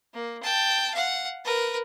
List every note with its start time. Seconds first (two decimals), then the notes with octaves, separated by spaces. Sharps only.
0.14 A#3
0.43 G5 A5
0.94 F5 F#5
1.45 A#4 B4